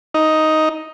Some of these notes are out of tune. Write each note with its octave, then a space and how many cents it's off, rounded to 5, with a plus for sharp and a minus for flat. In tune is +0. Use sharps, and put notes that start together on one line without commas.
D#4 +5